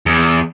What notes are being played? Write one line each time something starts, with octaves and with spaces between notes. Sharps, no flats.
E2